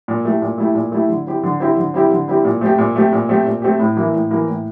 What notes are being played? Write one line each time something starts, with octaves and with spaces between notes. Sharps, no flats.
A#2
A3 E4 G4
A#2
A3 E4 G4
A#2
A3 E4 G4
D3
G3 C4 E4 G4
D3
G3 C4 E4 G4
D3
G3 C4 E4 G4
D3
G3 C4 E4 G4
A#2
A3 C4 G4
A#2
A3 C4 G4
A#2
A3 C4 G4
A#2
A3 C4 G4
A2
E3 A#3 E4
A2
E3 A#3 E4
A2